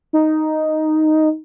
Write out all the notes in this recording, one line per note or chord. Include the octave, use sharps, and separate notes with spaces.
D#4